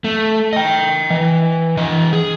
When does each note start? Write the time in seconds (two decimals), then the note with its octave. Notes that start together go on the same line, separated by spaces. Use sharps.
0.04 A3
0.53 D#5 G5
1.10 E3
1.77 E3 D#5
2.13 G#4